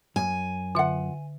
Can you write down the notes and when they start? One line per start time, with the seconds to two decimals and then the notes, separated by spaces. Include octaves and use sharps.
0.16 F#2 G#5
0.75 D3 F4 E5 F#5